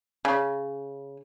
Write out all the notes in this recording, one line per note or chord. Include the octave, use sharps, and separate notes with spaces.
C#3